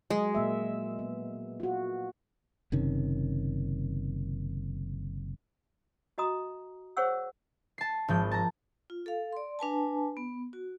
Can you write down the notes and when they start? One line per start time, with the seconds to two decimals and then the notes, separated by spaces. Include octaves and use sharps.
0.10 F#3 G#3 D#5
0.35 A#2 A#3 E5
0.99 B3
1.60 F4 F#4
2.72 F#1 C3 D#3 C#4
6.18 F#4 D#5 A#5 D#6
6.97 G#4 C5 C#5 F#5 C#6 E6
7.78 A5 C7
8.08 G#1 F3 G6
8.31 A5 A#5
8.90 F4
9.06 A4 F5
9.33 D5 C6
9.59 D4 B4 G#5 A5
10.17 B3
10.53 F#4